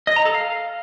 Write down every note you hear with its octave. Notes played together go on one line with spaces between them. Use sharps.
D#5
A#5
A4
F5